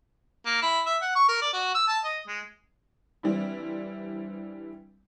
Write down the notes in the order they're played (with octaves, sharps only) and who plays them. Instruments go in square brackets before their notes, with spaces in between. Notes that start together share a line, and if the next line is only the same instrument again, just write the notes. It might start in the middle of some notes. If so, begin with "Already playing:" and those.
[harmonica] A#3
E4
E5
F#5
C#6
A#4
D5
F#4
E6
A5
D#5
G#3
[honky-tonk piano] E3 G3 C4 D4 E4